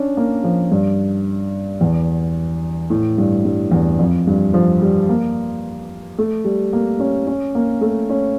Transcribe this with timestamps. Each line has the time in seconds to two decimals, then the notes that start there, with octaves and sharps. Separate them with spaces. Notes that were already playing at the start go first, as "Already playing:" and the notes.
Already playing: C#4 D4
0.17 A#3
0.44 F3
0.71 G2
1.81 E2
2.90 A2
3.18 G2
3.45 G2
3.71 E2
3.99 F2
4.27 G2
4.54 F3
4.82 G3
5.09 A#3
6.18 A3
6.45 G3
6.73 A#3
7.00 C#4
7.27 C#4
7.55 A#3
7.81 A3
8.09 C#4